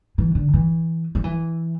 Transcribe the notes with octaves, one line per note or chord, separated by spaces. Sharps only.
E3
D3
E3
F3
E3